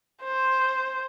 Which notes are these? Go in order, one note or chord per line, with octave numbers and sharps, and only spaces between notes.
C5